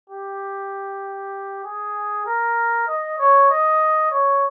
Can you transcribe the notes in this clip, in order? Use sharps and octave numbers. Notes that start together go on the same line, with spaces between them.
G4
G#4
A#4
D#5
C#5
D#5
C#5